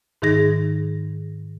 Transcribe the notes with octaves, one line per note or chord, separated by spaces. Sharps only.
G#2 D#3 D#4 G#4 A#6